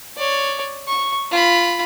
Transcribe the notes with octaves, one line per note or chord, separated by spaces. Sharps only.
C#5 D5
C#6
F4 B5